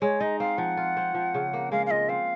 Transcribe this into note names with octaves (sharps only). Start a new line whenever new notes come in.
G#3 C#5
D#4 D#5
C4 F5
F3 F#5
F4
C4
F3
C#3
A#3
G#3 F5
F5
F4 D#5
C4 F5